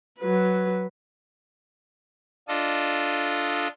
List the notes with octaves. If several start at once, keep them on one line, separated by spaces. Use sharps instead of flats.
F#3 B4
D4 F4 A4 D#5